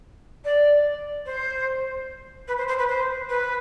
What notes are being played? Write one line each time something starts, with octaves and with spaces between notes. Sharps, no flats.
D5
C5
B4
C5
C5
B4
C5
B4